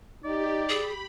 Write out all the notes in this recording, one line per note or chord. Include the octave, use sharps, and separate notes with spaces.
D#4 G4 D5
G#4 B5